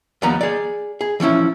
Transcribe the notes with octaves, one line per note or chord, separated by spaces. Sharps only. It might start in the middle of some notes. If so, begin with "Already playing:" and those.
D#2 F3 G3 B3 A#5
G#4 D5
G#4
E3 F3 C#4 E4